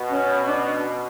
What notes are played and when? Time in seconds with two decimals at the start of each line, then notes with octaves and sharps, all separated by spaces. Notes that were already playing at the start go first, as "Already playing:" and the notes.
Already playing: B2
0.09 C#4
0.46 D4